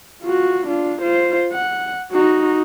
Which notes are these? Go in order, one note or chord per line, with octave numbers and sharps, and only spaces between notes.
F4 F#4
D4 F4
F4 C5
F#5
D#4 F#4